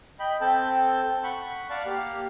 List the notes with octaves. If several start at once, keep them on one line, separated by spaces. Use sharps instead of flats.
D#5 G5 B5
C4 A4 G5 A5 G6
F#5 B5 C#6
D5 F5 F#5 A5
A#3 G4 F5